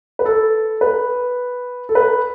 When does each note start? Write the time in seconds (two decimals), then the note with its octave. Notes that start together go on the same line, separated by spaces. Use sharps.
0.19 B4
0.25 A4
0.81 B4
1.89 A4
1.95 B4